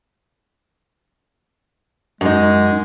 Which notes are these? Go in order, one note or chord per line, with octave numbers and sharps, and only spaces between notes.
F#2 G#3 D#4